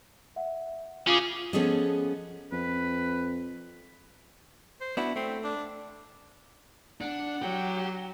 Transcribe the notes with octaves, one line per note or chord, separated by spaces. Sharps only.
E5 F#5
C#4 F4 G#4 F5 D6
F3 B3 C#4 G#4 A4 D#5
F2 B4
C5
B3 D4 E4 F#4
A3 C4
D4
D4 F#5
F#3 G4